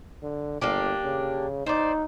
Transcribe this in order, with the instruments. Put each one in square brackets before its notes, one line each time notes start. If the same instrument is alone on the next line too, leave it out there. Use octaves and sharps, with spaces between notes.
[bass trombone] D3
[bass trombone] G1 [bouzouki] A#3 D4 G4
[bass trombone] C#3
[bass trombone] D#4 [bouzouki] C5 D5